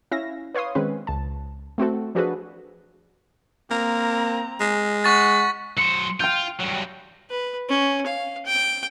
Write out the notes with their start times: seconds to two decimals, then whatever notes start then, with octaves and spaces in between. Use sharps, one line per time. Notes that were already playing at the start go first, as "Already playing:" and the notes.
0.11 C#4 E4 E5 F5 A#6
0.54 B4 C#5 F5 C6 D#6
0.75 D#3 G#3 C4 C#4 B4
1.07 C#2 A5
1.78 A3 C4 F#4 A4
2.15 F3 D4 F#4 G#4 A4 B4
3.70 A#3 C4 A#5
4.60 G#3
5.04 F#5 C#6 A6 B6
5.77 F#3 C5 C#7
6.20 F4 G5 F6 G6
6.60 G2 F#3
7.30 B4
7.69 C#4
8.07 F5
8.45 G5